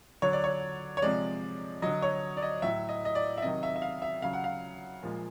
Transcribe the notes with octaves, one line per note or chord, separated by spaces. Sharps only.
D3 F#3 C#5
D5
C#5
C#5
C3 F3 G#3 D5
D3 F#3 D#5
C#5
D5
D#5
A2 F#3 E5
D#5
D#5
D5
E5
C3 D#3 F#3 D#5
E5
E5
F5
E5
C#3 F#3 F5
F#5
F5
A#2 F3 G#3